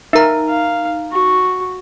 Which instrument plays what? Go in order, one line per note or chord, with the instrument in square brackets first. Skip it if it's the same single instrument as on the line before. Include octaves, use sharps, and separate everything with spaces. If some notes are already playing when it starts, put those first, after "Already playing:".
[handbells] D#4 A#5 [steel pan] A#4 E5
[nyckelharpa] F5
F#4